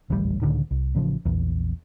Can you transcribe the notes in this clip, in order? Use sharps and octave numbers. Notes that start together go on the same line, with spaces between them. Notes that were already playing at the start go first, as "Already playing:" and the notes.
D#1 A1 D2 G3
C#2 A2 D3 D#3
C2
A1 C#3 F3
A#1 E2